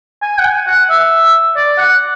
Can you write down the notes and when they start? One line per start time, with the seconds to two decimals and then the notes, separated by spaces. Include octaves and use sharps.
0.22 G#5
0.39 F#5
0.45 G#5
0.67 F#5
0.90 E5
1.56 D5
1.78 F#5